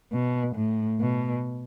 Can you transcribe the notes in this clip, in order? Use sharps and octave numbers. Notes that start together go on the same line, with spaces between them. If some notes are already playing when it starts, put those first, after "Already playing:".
B2
A2
B2